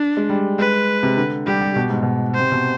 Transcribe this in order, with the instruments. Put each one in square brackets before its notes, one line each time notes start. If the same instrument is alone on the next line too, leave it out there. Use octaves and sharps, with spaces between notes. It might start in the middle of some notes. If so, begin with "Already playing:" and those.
Already playing: [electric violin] D4
[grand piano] G#3
G3
[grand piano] G#3 [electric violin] B4
[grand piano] C3
D3
[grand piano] G3 [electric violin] G4
[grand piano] G3
B2
G#2
B2
[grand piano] C3 [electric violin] C5
[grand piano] B2